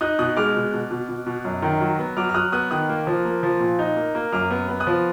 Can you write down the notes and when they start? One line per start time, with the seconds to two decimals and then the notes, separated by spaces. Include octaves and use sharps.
0.01 D#4 D#6 F#6
0.19 B2 D#6 F#6
0.37 G#3 D6 F6
0.55 B2
0.73 B2
0.91 B2
1.09 B2
1.27 B2
1.45 F#2
1.62 D#3
1.81 F#3
1.99 B3
2.17 F#3 D6 F6
2.29 F6
2.34 F#3 D#6 F#6
2.52 B3 D#6 F#6
2.71 D#3 D#6 F#6
2.89 A#3
3.07 F3
3.25 A#3
3.43 F3
3.60 A#2
3.79 D#4
3.96 A#3
4.15 A#3
4.32 F#2 D6 F6
4.50 B3
4.69 B3
4.80 D#6 F#6
4.87 F3